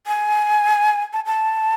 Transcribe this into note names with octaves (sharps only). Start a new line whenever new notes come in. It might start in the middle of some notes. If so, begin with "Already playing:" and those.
G#5
A5
A5